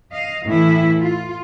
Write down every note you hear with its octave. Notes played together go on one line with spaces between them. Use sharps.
D#5 F5
A2 E3 E4
F4